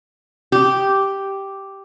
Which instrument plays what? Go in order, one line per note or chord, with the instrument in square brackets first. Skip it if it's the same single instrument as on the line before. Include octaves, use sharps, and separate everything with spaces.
[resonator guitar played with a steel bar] G4